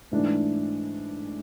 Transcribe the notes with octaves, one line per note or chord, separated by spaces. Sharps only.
G#2 E3 A3 D4